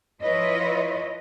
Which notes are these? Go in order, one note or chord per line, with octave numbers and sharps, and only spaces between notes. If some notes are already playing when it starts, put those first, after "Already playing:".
F3 E4 F4 B4 C#5 D#5